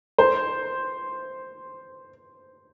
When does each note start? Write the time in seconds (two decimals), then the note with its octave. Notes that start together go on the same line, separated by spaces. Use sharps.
0.18 C5